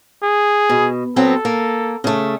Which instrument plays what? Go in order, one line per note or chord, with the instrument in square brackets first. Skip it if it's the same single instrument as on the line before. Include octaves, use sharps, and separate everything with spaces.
[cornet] G#4
[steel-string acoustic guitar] B2
[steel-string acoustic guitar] F#3 B3 C4 [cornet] A4
[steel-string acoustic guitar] A#3
C#3 A3